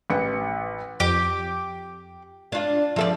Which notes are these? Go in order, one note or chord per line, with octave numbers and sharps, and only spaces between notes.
A1 B4 C#7
F2 G4 D6
D4 F4 D5
F3 A4 D5 E5